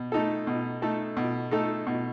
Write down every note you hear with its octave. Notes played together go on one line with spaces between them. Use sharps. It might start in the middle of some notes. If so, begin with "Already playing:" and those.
Already playing: B2
A3 D#4 A4
B2
A3 D#4 A4
B2
A3 D#4 A4
B2